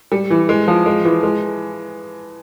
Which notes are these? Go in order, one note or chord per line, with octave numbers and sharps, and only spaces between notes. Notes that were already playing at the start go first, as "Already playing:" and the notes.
G3
E3
G#3
F3
G#3
E3
G#3